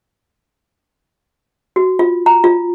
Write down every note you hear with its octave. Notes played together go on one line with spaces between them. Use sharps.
F#4
F4
A#5
F4